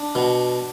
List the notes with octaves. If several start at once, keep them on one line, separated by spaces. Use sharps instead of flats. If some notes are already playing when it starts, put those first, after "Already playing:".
Already playing: D4
B2